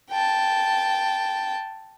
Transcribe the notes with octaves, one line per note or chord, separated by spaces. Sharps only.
G5 A5